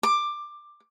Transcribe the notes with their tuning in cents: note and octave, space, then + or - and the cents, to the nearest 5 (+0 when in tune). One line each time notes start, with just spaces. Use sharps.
D6 +15